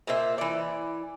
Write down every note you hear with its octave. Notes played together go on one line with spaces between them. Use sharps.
A#2 A#3 C5 E5
E3 D5